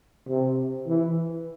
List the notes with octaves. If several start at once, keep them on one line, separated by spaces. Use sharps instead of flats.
C3
E3